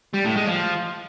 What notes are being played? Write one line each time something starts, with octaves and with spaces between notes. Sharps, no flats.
G3
A2
G#3
F3